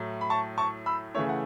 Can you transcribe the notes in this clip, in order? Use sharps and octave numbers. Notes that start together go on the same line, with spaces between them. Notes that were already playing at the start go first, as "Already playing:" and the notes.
Already playing: A2 F#3 A3
B5
A5 C#6
A5 C#6
B5 E6
C#3 E3 A3 E4 C#5
F#5